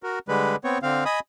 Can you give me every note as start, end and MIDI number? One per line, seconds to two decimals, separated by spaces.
0.03 0.19 66
0.03 0.19 70
0.29 0.56 50
0.29 0.56 55
0.29 0.56 56
0.29 0.56 71
0.64 0.78 59
0.64 0.78 60
0.64 0.78 73
0.83 1.04 50
0.83 1.04 60
0.83 1.04 77
1.05 1.20 75
1.05 1.20 80
1.05 1.20 83
1.05 1.20 87